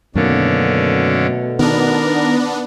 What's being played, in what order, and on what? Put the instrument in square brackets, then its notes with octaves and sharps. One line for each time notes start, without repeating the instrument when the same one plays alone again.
[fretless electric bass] F#2 D#3 A#3 [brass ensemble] B2 A3 [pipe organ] D3 C#4 D4
[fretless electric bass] D#3 [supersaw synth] B3 D4 [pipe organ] A#4